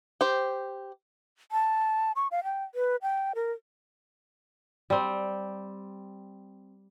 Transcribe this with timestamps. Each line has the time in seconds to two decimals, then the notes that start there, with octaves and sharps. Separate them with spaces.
0.21 G4 C5
1.52 A5
2.16 C#6
2.31 F5
2.44 G5
2.75 B4
3.02 G5
3.35 A#4
4.90 G3 C4